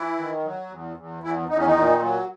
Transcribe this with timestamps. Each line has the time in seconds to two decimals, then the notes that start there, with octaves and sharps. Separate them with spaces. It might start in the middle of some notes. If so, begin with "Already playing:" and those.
Already playing: E3 E4
0.17 D#3
0.44 F#3
0.70 E2
0.97 E2
1.23 E2 E3 E4
1.49 E2 D#4
1.58 C#4
1.66 D#3 D#4
1.76 A#2
2.02 F#3